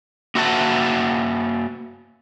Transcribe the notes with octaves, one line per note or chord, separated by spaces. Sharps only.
A#3 F#4 E5 F#5 A5